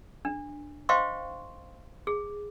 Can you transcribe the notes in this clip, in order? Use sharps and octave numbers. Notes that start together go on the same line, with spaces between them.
D4
C5 D#5 F5 G5 C6 C#6
G#4